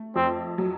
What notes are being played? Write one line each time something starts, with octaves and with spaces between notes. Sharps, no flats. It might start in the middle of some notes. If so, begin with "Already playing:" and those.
Already playing: A3
F2 C4
F#3